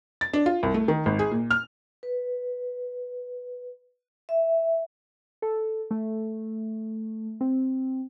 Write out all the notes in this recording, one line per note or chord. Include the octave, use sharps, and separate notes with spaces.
A6
D4
F4
C2
A3
D#3
G#1
G#4
A#2
F6
B4
E5
A4
A3
C4